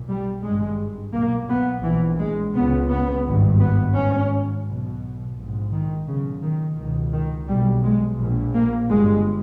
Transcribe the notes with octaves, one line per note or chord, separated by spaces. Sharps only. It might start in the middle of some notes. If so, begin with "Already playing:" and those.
Already playing: B1 A#2
G3
G#1 G2 G#3
B1 A#2 A#3
B3
A#1 A#2 E3
G#3
C#2 C#3 B3
B3
G#1 G2
B3
G#1 G#2 C#4
B1 B2
A#1 G#2
D#3
B1 A#2 C#3
D#3
C#2 B2 D#3
D#3
B1 A#2 G3
G#3
A#1 A#2
A#3
G1 G2 G#3